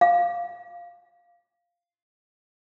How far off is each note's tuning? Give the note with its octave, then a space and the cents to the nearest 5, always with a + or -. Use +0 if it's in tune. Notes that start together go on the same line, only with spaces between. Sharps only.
F5 -5